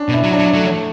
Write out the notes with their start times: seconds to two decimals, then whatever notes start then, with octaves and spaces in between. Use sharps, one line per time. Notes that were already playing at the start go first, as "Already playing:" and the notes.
Already playing: C#4 D4
0.09 B2
0.14 E4
0.24 F#3
0.33 D4
0.39 F#3
0.54 F#3 A3